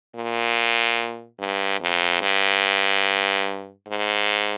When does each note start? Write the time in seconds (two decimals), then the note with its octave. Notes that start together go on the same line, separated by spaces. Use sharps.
0.16 A#2
1.40 G2
1.81 F2
2.22 G2
3.87 G#2